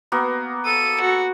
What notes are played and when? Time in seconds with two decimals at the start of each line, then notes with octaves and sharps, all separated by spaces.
0.12 A#3 B3 F#4
0.65 A4 D#7
1.01 F#4